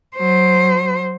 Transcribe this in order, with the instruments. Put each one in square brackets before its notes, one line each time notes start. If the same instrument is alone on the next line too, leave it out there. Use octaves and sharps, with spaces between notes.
[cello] F#3 C5